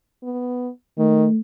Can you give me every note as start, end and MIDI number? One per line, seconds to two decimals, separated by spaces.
0.23 0.70 59
0.98 1.27 51
0.98 1.39 57